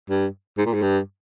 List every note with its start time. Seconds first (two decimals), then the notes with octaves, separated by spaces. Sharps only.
0.10 G2
0.58 G#2
0.66 A#2
0.74 G#2
0.82 G2